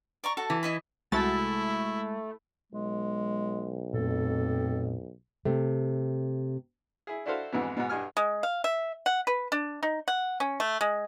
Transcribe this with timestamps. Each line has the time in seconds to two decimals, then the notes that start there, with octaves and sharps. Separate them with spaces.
0.24 D5 A#5 C#6
0.37 F#4 A4 A5
0.50 E3
0.63 E4 D#5 B5
1.12 C2 G#3 A3 E4 F#4 A6
2.72 B1 G#3
3.93 F2 A#2 A3 A4
5.45 C3 A3
7.07 E4 G#4
7.26 D4 E4 F#4 A4 C5 F5
7.52 F2 G#2 B2 E3
7.77 G#2 B2
7.89 B1 G2 G#5 F6
8.17 G#3
8.43 F5
8.64 E5
9.06 F#5
9.27 B4
9.52 D4
9.83 D#4
10.08 F#5
10.40 C#4
10.60 A3
10.81 G#3